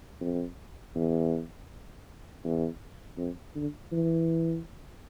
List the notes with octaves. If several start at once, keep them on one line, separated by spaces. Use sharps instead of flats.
F2
E2
E2
F2
D3
E3